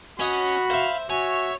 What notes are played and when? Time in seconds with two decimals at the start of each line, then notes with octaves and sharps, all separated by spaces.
0.19 C#4 F#4 C#5 D#5 F#5 B5
0.71 C5 E5 F5
1.10 F#4 C#5 E5 G#5